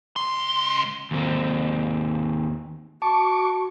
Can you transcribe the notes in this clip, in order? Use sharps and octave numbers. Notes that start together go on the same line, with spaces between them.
C#2 C6
D#2 C4
F#4 A5 C#6 D6